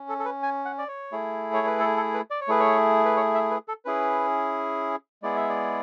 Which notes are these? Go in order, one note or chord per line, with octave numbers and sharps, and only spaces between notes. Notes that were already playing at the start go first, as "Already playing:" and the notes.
Already playing: C#4
A4
A4
B4
G#5
F#5
D5
C#5
A3 E4 G#4
C#5
B4
A4
A4
B4
D5
C#5
A3 E4 G#4 B4
C#5
B4
C#5
E5
B4
A4
C#4 E4 G#4 B4
G#3 B3 E4 G#4 D5
E5
D5